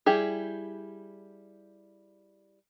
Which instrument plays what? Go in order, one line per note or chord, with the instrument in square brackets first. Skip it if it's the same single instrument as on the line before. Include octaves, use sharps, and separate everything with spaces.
[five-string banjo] G3 E4 G4 G#4